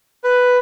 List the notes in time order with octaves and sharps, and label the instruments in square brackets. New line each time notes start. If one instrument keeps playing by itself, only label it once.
[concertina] B4